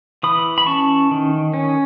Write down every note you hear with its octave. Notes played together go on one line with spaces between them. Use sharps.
E3 B5 D#6
B5
C#4 A5 C#6
D#3
C#4